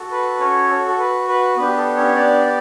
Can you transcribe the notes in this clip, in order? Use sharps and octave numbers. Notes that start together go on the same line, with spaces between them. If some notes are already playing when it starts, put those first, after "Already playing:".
Already playing: F#4 A4
B4
C#4 C#5
A4
A4
B4
B4
B3 D4 G4 B4
A4
C#4 C#5
D4 D5
D5